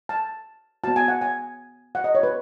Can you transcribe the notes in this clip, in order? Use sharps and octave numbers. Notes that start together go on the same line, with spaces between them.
A5
B3 F#4 A5
G#5
F#5
G#5
F#5
D#5
C#5
B4